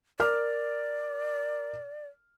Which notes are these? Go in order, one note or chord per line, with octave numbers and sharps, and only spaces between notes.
A#4 D5 D6 F6